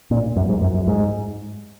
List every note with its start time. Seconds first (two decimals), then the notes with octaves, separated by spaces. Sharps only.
0.11 A#2
0.36 F#2
0.49 G#2
0.61 F#2
0.74 F#2
0.87 G#2